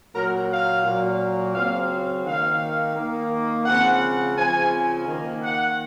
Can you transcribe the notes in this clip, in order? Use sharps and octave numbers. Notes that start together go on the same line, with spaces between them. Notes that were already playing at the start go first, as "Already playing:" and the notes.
A#2 F#3 A#3 A#4
F5
A#2 F#3 A#3
C#3 F#3 C4 F5
D#3 A#3 F5
D#3 A#3
C#3 F3 G#3 C4 F#5
C#3 F3 C4 G#5
D#3 A#3
F#5